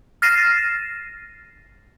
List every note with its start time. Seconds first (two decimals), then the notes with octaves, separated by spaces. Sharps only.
0.22 F6 A6 A#6 C7 D#7 E7